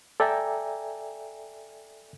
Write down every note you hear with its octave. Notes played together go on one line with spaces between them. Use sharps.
A4 D5 E5 G5 G#5 A#5